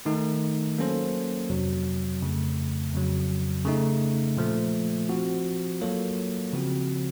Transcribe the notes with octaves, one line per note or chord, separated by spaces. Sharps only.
D#3 A3 D#4
F#3 A#3 C#4 A4 C5
F2 C3 F#3
F2 C#3 A3
F2 C#3 F#3
C#3 A3 D#4
A#2 F3 A3
F3 C4 F#4
F#3 A#3 F4 A4 C#5
C#3 F3 C4 F#4